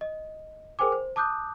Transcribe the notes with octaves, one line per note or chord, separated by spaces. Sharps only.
D#5
G#4 A#4 C5 G5 G#5 D6
C5
A5 D6 D#6 F#6 G6